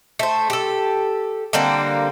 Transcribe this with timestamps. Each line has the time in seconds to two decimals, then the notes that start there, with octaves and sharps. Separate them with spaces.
0.19 A3 C5
0.50 G4 A4
1.53 D3 G3 A#3 C4